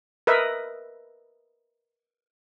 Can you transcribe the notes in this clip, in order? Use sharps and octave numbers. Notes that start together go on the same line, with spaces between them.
A#4 B4 D#5 E5